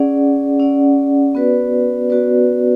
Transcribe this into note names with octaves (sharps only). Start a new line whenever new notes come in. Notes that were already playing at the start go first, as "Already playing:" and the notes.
Already playing: C#4 G#4 D5 F#5
C#4 G#4 D5 F#5
B3 F#4 B4 D5
B3 F#4 B4 D5